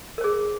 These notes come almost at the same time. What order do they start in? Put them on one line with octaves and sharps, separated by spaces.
A#4 C5 G#4